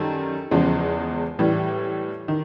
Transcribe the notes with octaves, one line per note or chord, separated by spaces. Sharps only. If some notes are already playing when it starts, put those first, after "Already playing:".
Already playing: F#2 D#3 G3 A4
E2 C#3 F3 G#3
A2 E3 G3
D#3